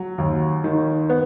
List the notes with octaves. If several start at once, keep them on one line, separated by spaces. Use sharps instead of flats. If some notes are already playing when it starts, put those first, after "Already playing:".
Already playing: F#3
D#2
D#3
B3